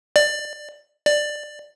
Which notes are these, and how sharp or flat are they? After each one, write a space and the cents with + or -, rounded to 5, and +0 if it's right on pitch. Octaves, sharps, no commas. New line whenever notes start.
D5 +20
D5 +15